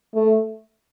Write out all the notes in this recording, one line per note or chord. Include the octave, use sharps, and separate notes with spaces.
A3